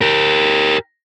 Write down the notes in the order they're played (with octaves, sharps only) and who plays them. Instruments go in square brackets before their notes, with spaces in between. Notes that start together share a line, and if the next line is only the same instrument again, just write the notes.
[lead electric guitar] G4 A#4